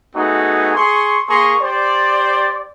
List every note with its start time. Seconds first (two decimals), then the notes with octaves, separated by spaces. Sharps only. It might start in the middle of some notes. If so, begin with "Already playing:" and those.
0.15 A3 B3 D#4 F#4 G#4
0.76 G#4 C6 C#6
1.29 A#3 G#4 A#5 C6 C#6
1.61 G4 C5 D5